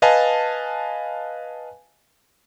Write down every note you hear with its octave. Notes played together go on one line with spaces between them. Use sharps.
B4 D#5 F5 G#5 A5